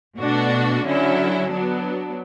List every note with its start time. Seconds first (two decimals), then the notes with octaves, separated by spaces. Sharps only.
0.19 B2 A3 D4 F#4
0.84 D3 F#3 C#4 E4
1.50 F#3 B3 D4